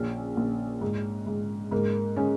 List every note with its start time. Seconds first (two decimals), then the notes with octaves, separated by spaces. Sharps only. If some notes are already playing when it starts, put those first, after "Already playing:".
Already playing: A#1 C#4
0.37 A#1
0.81 G#2
1.26 G#2
1.71 G#2 A#3
2.16 G#3 C#4